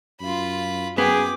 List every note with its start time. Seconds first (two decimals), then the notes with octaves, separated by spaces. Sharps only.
0.21 F#2 F4 B5
0.98 F#2 B3 G#4 G5 D6